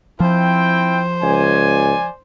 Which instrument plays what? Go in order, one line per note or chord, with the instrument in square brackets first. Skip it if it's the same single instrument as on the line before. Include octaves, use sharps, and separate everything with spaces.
[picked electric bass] F3 [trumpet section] C4 E4 G5 [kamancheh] C5
[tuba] C#2 [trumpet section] D5 G#5